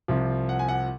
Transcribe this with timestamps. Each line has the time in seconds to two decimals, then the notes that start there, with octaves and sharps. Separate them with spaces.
0.08 C2 C3 F3
0.49 F#5
0.59 G#5
0.68 F#5